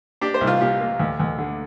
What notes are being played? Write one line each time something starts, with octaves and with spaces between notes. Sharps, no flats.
D4 G4
C5
C2
F4
A#2 G4
A#3
D2
D2
D3